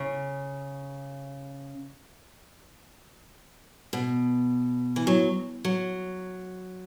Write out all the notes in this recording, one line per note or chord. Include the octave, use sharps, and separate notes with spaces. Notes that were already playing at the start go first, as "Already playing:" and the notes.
Already playing: C#3
B2
E3
F#3
F#3